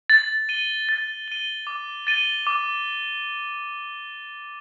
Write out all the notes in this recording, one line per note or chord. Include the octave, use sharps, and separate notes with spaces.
A6
D#7 G7
A6
D#7 G7
D6
A6 D#7 G7
D6